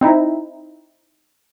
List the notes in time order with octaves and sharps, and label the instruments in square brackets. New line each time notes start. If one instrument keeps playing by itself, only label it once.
[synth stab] C4 D#4 E4